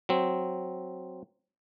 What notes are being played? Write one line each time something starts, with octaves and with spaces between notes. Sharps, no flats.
F#3 C4